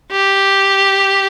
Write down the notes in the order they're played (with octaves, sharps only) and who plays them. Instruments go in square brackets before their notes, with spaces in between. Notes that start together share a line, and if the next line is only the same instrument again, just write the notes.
[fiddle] G4